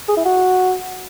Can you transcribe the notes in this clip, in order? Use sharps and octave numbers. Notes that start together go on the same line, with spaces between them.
G#4
E4
F#4